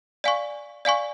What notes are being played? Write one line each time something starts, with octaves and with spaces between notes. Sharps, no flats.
D5 F5 G#5 C#6
D5 F5 G#5 C#6